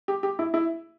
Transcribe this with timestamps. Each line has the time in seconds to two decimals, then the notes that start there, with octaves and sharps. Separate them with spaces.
0.08 G4
0.23 G4
0.39 E4
0.54 E4